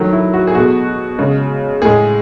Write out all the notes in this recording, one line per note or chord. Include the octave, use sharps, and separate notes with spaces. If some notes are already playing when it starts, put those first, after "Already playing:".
Already playing: D#3 F#3 A3
E4
F#4
G#4
B2 A3 F#4
C#3 G#3
A2 G#3 G#4